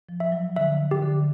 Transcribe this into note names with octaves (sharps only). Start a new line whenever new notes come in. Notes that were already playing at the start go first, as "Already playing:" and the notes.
F3
E5
F#3
D3 E5
G4
D3